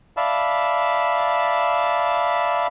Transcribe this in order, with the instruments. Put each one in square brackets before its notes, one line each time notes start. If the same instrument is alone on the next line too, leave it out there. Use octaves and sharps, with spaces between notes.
[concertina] D5 E5 F5 A5 B5